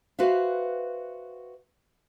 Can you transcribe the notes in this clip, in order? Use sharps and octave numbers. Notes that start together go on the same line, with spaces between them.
F#4 B4 C5 E5 F5